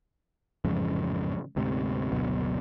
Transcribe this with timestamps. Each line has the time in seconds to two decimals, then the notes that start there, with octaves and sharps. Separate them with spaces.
0.65 A1 F2 G#2 C#3
1.56 D2 G#2 C3
2.12 F#1 D2 B2 F#3